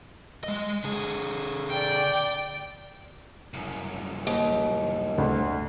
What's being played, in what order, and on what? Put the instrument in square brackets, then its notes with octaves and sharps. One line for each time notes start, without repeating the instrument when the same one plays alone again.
[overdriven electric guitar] G#3 D#5
D3 G#4
[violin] D5 G5
[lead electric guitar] C2 F#2
[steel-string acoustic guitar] D#2
[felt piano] D2